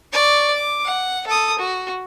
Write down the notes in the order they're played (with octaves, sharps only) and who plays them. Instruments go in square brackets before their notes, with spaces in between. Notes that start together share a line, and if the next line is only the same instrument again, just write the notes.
[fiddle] D5 C#6
D6
F#5
A4 D#6
F#4